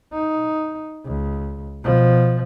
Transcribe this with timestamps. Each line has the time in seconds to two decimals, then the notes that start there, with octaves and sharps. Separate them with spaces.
0.13 D#4
1.05 C#2
1.83 B2 F3